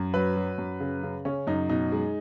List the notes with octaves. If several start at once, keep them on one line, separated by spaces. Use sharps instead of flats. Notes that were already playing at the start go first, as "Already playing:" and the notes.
Already playing: F#2
F#3 B4
F#3
F#2
C#3
C#3
C#3 C#4
F#2 D#4
B2 D#4
G#3